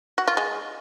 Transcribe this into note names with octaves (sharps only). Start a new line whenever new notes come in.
F#4
F4
G#3